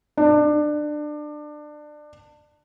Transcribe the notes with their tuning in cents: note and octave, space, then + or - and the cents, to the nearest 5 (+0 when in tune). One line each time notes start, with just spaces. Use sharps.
D4 +25